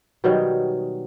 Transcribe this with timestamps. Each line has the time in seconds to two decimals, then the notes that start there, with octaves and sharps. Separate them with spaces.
0.24 B2 D#3 F#3 G3